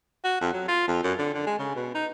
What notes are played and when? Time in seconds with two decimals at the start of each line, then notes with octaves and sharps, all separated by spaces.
0.24 F#4
0.41 F2
0.53 F#3
0.68 F4
0.88 F2
1.03 F#2
1.19 D3
1.34 D3
1.46 G#3
1.59 C#3
1.75 B2
1.95 D#4